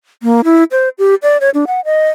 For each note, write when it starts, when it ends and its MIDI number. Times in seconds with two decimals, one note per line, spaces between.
0.23 0.41 58
0.44 0.64 64
0.71 0.89 72
0.99 1.15 67
1.23 1.37 74
1.41 1.50 73
1.54 1.65 62
1.67 1.80 78
1.85 2.10 75